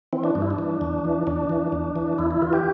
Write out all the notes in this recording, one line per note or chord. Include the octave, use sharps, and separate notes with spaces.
E3 C4
D4
G2 D4
E4
D4
E3
E2
E3
E2 D4
E3
E2
E3
E2 E4
E4
E3 F4
G4